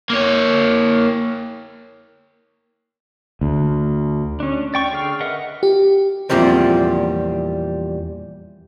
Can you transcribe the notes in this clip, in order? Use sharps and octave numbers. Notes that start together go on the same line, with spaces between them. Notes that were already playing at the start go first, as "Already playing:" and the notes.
A#3 C#5
D2
C#4 D4
D5 G5 C#6
D3 G#4 G5 F6
A#4 B4 D#5 E5 F#5
G4
E2 A#2 F3 G3 C4